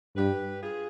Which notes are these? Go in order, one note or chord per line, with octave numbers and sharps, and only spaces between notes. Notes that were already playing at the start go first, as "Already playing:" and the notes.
G2 G4 B4
F4 G#4